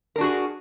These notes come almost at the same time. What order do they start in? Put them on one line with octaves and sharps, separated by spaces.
A#4 D4 F#4 G#4